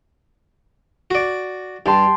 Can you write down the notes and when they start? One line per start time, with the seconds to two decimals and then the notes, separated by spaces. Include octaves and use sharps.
1.11 F#4 D5
1.86 G2 G5 A5 C6